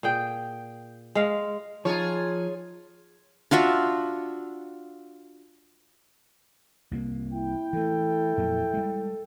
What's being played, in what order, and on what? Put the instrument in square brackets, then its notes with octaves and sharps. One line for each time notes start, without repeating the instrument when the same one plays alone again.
[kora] A#2 G#4 G5
G#3 F5
[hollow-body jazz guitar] F3 D#4 [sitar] F4 G#4 C#5
[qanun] D4 F4 F#4 E5
[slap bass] C2 A#3
[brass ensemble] E4 G5
[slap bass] E3 A3 [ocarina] A4
[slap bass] F2 A#2 F#3
G3 G#3